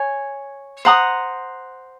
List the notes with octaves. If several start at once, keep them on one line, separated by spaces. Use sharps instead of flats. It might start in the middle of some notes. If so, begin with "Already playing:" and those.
Already playing: C#5 G#5
C5 F#5 A#5 D#6